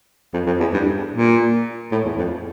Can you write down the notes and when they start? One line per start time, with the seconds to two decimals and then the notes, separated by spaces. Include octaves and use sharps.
0.34 F2
0.47 F2
0.60 E2
0.74 G2
1.14 A#2
1.92 A2
2.05 E2
2.18 F2